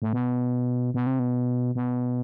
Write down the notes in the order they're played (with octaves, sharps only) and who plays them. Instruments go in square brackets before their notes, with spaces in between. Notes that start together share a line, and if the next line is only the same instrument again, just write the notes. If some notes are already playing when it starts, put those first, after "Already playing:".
[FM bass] A2
B2
B2
C3
B2
B2